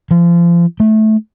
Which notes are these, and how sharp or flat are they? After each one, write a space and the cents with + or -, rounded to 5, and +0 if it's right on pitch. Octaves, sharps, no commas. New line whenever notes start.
F3 -30
A3 -15